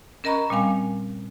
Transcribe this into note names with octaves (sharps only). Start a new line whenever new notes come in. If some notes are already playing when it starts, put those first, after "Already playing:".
C#4 A#4 D#5 A#5 B5 C#6
A#2 G3 C4 F5 G#5